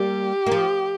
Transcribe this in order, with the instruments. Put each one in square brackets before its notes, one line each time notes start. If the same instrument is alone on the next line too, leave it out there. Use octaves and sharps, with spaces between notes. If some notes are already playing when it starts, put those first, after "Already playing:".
Already playing: [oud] G3 A#3 [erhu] G4
[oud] A#3
F3